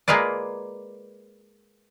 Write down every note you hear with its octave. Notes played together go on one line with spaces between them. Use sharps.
G#3 A#3 F4 B4 D5